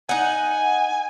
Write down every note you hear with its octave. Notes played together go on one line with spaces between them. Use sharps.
D#4 F#5 G#5